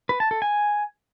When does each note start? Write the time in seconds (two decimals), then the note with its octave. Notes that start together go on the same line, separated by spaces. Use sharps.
0.09 B4
0.20 A5
0.31 A4
0.42 G#5